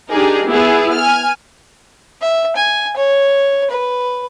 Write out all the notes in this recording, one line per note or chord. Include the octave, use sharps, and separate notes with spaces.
D4 D#4 G4 G#4 A#4
B3 E4 G#4
G#5 F6
E5
G#5
C#5
B4